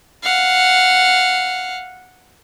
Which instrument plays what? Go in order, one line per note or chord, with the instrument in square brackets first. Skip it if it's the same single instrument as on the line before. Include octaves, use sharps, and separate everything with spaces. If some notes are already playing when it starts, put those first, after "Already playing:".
[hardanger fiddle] F5 F#5